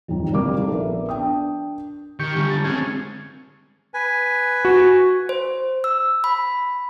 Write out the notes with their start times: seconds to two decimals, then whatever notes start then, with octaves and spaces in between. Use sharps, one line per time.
0.08 D#1 F2 D#3
0.31 G1 C3 G3 A#3 D6
0.57 D#4 A4
0.69 A#1 B3 A#4 E5
1.09 D4 G5 D#6
2.20 D#3 G4 C#6
2.36 D3 G3
2.50 A5
2.64 G#3 C4 C#4 G#4
3.94 B4 G#5
4.65 F#4
5.29 C5
5.84 E6
6.24 B5